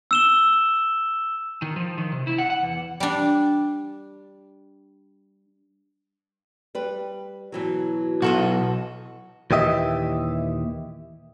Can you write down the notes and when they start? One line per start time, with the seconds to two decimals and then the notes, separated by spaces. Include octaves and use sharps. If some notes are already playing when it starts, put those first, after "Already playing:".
0.11 E6 E7 G7
1.62 D#3
1.76 F3
1.98 D#3
2.12 C3
2.27 E4
2.38 F#5
2.50 F#5
2.63 E2
3.00 G3 D4
6.75 G3 B4
7.52 B2 E3 F#3
8.22 B1 F#4 A4 D#5
9.51 D#2 A#2 E3 G4 D#5 E5